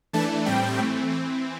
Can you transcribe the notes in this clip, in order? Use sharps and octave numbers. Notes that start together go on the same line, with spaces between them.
E3 A3 D4 A5
A2 G3 C4 G5
E3 A3 C4
E3 C4